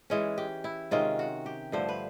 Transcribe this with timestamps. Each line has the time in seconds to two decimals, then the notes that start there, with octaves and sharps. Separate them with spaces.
0.10 E3 G#3 C#4
0.38 G4
0.64 E4
0.91 C3 D#3 G#3 C#4 F4
1.19 F#4
1.46 G4
1.72 G2 D3 F3 A3 C5
1.89 B4